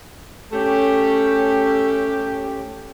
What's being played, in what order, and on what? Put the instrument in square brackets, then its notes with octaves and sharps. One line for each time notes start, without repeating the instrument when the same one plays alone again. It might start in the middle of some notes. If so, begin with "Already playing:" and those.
[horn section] A3 C#4 G4